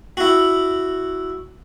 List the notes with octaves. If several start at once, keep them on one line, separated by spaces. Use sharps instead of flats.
E4 F#4